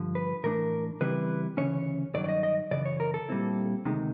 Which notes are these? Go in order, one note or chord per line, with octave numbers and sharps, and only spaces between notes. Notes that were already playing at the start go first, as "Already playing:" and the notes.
Already playing: G2 D3 F3
B4
A2 E3 A3 D4 A#4
C#3 E3 G3 C4 E4 B4
D2 C#3 E3 C#4 C#5
G2 D#3 F#3 D5
D5
D#5
D#5
F#2 C#3 E3 D5
C#5
A#4
A4
A#2 G3 C4 E4
D2 C3 D#3 G#3